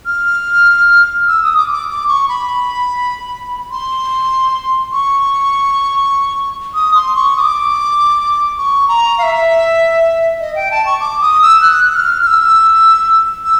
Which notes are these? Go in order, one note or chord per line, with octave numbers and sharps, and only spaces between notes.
F6
E6
D#6
D6
D6
D6
C#6
B5
C6
C#6
D#6
C6
C#6
D#6
D6
C#6
A#5
F5
E5
D#5
G5
A5
C#6
D6
D#6
E6
F#6
F#6
F6
F6
E6
E6